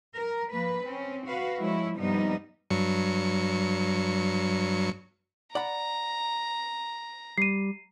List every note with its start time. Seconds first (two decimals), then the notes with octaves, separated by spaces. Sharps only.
0.15 A#4
0.52 F3 A#3 B4
0.84 C4 C#4
1.26 F#4 B4 F5
1.59 F3 G#3 E4 C#5
1.97 G2 C3 F3 G3 B3 D#4
2.70 G2 F#3 C#7
5.55 D5 F#5 A#5 B5
7.38 G3 C7 D#7